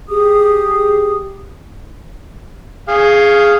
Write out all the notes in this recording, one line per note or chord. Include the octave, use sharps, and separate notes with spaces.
G4 G#4 D6 D#6
G#4 F5